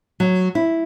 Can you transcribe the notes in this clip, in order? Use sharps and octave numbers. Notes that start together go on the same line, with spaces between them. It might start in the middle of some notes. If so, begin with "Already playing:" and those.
F#3
E4